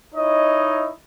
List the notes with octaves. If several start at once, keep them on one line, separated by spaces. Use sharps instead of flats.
D#4 E4 C#5 D#5